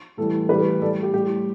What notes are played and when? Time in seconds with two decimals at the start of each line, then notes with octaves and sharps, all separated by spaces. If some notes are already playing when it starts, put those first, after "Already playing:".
0.17 A2 E3 G3 A4
0.49 A2 E3 G3 G4 B4
0.81 A2 G3 A4 D5
1.03 G4
1.13 A2 G3 G4